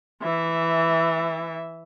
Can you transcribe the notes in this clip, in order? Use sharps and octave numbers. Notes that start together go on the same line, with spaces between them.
E3 E5